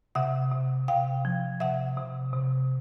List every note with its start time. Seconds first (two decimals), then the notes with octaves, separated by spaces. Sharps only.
0.15 C3 E5 F#5
0.52 C3
0.88 C3 F5 G5
1.25 F3
1.60 C3 E5 F#5
1.97 C3
2.33 C3